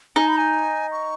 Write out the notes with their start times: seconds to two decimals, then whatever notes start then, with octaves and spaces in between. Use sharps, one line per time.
0.16 D#4 G#5
0.28 B5
0.39 G#5
0.92 C#6